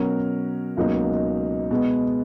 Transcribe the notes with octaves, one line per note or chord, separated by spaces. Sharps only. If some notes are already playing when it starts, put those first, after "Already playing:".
Already playing: B2 F#3 C#4 F#4 A#4
C#2 B2 F#3 A#3 D#4
B2 G#3 B3